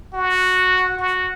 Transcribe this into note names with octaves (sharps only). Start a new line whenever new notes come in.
F#4
F#4